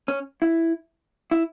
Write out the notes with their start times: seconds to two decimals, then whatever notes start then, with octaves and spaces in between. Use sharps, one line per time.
0.08 C#4
0.42 E4
1.31 E4